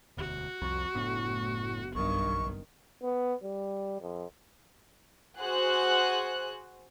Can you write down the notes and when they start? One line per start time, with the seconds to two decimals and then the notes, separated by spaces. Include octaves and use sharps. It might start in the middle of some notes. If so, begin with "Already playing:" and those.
0.17 E1 D2 F#4
0.62 C2 F2 C#6
0.94 F#1 A2 B3 D4
1.95 B1 G2 D#3 C#6
3.03 B3
3.43 G3
4.01 F2
5.39 F#4 G#4 C5 F#6